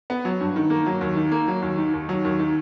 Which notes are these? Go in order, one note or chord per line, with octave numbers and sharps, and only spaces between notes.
B3
F#3
G2
D#3
A#3
F#3
D#2
D#3
A#3
F#3
D#2
D#3
D#2
F#3
D#2
D#3